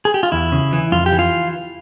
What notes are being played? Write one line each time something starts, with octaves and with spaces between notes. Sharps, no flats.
G#4
G4
F4
E2 E4
C#3
E3
F2 F4
G4
E3
F4